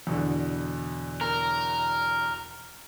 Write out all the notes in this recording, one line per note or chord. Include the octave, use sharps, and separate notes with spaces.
E2 B2 D3
A#4